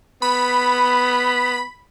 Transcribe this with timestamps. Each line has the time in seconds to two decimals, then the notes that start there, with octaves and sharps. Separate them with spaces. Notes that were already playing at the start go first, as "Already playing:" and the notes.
0.22 B3 B5